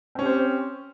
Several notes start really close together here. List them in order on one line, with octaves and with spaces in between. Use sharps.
C4 C#4 G4 C5